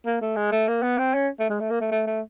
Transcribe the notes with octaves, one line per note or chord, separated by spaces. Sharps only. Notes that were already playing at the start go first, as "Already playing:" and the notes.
A#3
A3
G#3
A3
A#3
B3
C4
C#4
A3
G#3
A3
A#3
A3
A3
A3